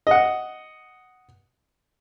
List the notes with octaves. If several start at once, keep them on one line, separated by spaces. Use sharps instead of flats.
D#5 F#5